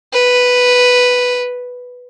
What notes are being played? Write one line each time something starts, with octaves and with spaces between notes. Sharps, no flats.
B4